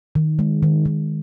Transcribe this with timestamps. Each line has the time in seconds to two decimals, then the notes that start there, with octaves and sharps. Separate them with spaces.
0.15 D#3
0.39 G#3
0.63 D#3
0.85 D#3